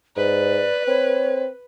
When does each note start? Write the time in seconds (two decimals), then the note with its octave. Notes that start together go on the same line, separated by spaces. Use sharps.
0.17 G#2 B4 D5
0.87 C4 C#5